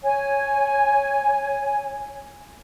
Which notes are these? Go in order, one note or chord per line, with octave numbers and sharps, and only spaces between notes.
C#5 G#5